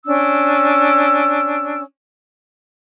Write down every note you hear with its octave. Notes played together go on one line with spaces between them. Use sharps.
C#4 D4 E6